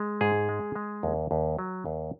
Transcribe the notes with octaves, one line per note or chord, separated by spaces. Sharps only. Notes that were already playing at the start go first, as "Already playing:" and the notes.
Already playing: G#3
G#2 G#4
G#3
G#3
D#2
D#2
F#3
D#2